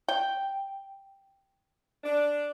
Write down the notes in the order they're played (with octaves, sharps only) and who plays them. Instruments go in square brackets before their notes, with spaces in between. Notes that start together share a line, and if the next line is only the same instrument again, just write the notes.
[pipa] G5
[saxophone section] D4